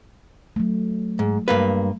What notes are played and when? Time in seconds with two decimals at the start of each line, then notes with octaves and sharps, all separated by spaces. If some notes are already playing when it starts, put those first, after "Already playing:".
0.56 F#3 A3
1.19 G#2
1.48 G2 A#3 B4